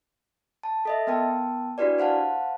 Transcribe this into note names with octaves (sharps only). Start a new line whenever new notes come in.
A5
A4 D#5 E5
B3 A#4 G5 A5
D4 E4 F#4 G4 B4 D5
C5 F5 F#5 A5